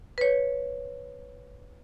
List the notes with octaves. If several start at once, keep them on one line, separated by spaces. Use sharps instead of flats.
B4 C#5